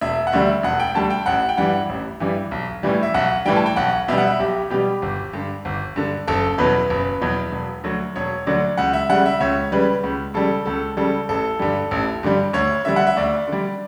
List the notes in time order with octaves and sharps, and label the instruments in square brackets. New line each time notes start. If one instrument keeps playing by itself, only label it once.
[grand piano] E1 E5
F#5
D2 D3 G3 E5
E1 F#5
G5
D2 D3 G3 A5
G5
A1 F#5
G5
G2 E3 G3 F#5
A1
G2 E3 G3
B1
A2 E3 G3
E5
B1 F#5
A2 E3 G3 G5
A5
G5
B1 F#5
B2 G3 E5
F#5
E5
B1 G4
B2 G3 G4
G1
G2 D3
G1
G2 D3
F#1 A4
E2 B2 F#3 B4
F#1
E2 B2 F#3
E1
D2 D3 F#3
E1 C#5
D2 D3 F#3 D5
C#2 F#5
E5
C#3 G3 F#5
E5
C#2 C#5
C#3 G3 B4
C#2
C#3 G3 A4
C#2 A4
C#3 G3 A4
A1 A4
G2 D3 G3
A1
G2 D3 G3
D2 C#5
D3 G3 E5
F#5
E5
D2 D5
D3 G3